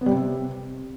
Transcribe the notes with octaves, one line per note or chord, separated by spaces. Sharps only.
B3
G3
C3